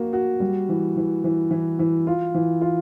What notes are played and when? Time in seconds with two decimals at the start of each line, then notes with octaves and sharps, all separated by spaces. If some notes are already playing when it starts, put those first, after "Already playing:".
Already playing: A#3 F#4
0.13 F#4
0.40 G3
0.69 E3
0.97 E3
1.24 E3
1.51 E3
1.79 E3
2.07 F4
2.34 E3
2.61 F4